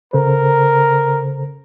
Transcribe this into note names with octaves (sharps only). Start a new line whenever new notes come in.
C#3 A4 A#4 C5